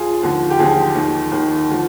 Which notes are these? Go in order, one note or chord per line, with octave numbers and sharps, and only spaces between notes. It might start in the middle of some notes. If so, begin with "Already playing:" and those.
Already playing: D#2 F4 G#4
D#2 D3 F3
G4
D#2 D3 F3 F4 G#4
D#2 D#3
D#2 D#3
D3 F3